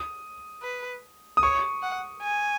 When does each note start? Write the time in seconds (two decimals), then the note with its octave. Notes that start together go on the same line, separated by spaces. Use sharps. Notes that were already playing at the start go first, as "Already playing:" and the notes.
Already playing: D#6
0.63 B4
1.37 D#6
1.42 C#5 C#6
1.82 F#5
2.23 G#5